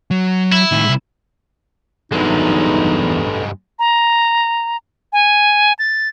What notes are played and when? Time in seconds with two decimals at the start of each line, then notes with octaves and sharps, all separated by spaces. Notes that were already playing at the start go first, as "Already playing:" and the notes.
0.11 F#3
0.52 E4
0.72 A2 D#3
0.85 C2 G#2
2.12 E2 G2 F#3 G#3 D#4 A4 B4
3.79 A#5
5.13 G#5
5.79 A6